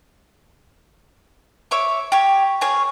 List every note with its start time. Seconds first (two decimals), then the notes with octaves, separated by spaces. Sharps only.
1.71 C#5 E5 D6
2.12 G4 C#5
2.61 G#4 A#4 C#5